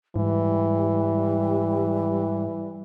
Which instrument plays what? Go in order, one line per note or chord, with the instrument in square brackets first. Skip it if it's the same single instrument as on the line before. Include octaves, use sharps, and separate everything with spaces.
[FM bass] G#2 [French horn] E3 [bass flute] G3